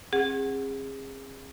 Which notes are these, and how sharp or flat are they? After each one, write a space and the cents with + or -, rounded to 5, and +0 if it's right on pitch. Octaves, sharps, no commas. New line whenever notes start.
C4 +40 G#4 -25 F#5 +0